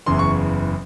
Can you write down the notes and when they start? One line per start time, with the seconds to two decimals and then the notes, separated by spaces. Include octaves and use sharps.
0.06 F#1 E2 C#3 E3 C6
0.19 C#6